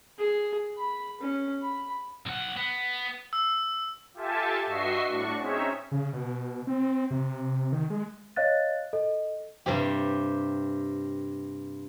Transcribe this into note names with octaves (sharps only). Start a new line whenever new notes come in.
G#4
B5
C#4
B5
B1 F#5
B3
E6
F4 G4 A4 E5 G#5 A5
G2 F#4 D#5 E5 C#6 C7
A2 D4 F#4 C#6
C4 C#4 D#4 G#4 C#5 E5
C#3
B2
C4
C3
D#3
G#3
C#5 D#5 F5 F#6 A6
A4 D#5
G2 C3 G4